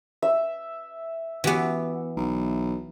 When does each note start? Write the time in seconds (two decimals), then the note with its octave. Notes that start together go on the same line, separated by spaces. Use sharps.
0.22 E5
1.44 E3 B3 F#4 G4 F#5
2.17 B1